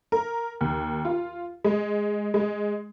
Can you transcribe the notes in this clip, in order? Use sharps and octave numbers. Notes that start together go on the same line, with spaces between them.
A#4
D#2
F4
G#3
G#3